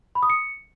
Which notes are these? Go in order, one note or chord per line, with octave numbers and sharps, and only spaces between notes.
B5
D#6
C#7